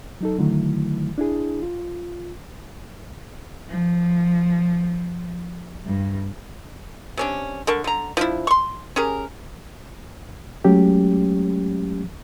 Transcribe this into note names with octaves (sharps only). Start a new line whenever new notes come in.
F#3 D#4 A4
D3 D#3 F#3 A3 E4
D4 E4 G#4
F4
F3
G2
C3 C#4 D4
D3 A#4 A5 C#6
D3 A#5
F3 D4 E4
C6 C#6
C#4 G4 G#4 A#4
F#3 G#3 A3 C#4 G4